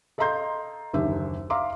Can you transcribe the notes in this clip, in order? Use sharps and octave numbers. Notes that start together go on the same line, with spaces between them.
A4 D#5 F5 A#5 C6 G6
F#1 D#2 D3 G4 E5
E5 F5 A#5 C6 D6